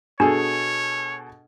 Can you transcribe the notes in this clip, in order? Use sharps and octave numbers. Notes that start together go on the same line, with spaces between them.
B2 D4 G#4 A4 C#5